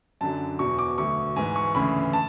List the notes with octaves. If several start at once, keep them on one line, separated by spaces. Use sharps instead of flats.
F#2 D3 F#3 A5
E2 B2 F#3 C#6
D6
D2 D3 F#3 C#6
G#2 E3 G#5
C#6
D2 C#3 E3 B5
A5